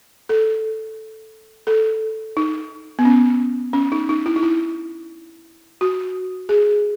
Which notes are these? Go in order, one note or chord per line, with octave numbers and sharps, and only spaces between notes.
A4
A4
D#4
B3
C#4
C#4
D#4
D#4
E4
D#4
E4
F#4
G#4